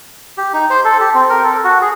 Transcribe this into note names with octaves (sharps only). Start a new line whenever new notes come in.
G4
D#4
C5
A4
G4
C4
A#4
A4
F#4
G#4